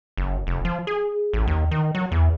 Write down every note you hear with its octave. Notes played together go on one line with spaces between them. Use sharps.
F#1
F1
F3
G#4
A1
D#2
D#3
F#3
E2